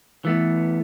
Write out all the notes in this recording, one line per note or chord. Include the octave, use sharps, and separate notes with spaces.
E3 A3 B3